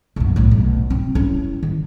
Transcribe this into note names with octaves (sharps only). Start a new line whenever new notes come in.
B1 F#2
B1 A2
B1
C4
C#4 E4
D#3